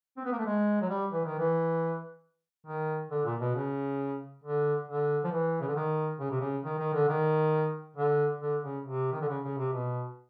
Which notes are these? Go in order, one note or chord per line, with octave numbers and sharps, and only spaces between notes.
C4
B3
A#3
A3
G#3
F#3
G3
E3
D#3
E3
D#3
D3
A#2
B2
C#3
D3
D3
F3
E3
C#3
D3
D#3
C#3
C3
C#3
D#3
D#3
D3
D#3
D3
D3
C#3
C3
D#3
D3
C#3
C#3
C3
B2